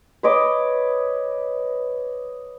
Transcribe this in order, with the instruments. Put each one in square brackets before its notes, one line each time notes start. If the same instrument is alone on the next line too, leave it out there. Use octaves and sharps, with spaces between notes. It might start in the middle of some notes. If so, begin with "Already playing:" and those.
[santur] B4 C#5 D#5 D6